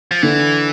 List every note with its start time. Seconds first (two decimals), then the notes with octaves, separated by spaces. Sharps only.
0.11 F3
0.22 D3 E3